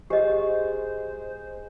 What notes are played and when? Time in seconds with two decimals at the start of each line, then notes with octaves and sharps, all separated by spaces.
0.10 G#3 G4 C5 D#5